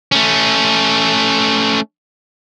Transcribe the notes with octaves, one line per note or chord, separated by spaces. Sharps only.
A3 C#4